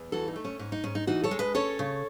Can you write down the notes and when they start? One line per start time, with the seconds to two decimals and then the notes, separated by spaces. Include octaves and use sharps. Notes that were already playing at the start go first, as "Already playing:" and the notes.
Already playing: E2
0.12 E3 F#4 A4
0.28 D#4
0.36 A3
0.45 C#4
0.59 G#2 C#4
0.72 D#4
0.84 G#2 C#4
0.95 D#4
1.07 E3 D#4 F#4
1.24 A4 C#5
1.31 G#3
1.39 B4 D#5
1.55 C#4 A4 C#5
1.79 C#3